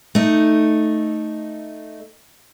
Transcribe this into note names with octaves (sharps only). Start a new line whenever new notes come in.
A3 D#4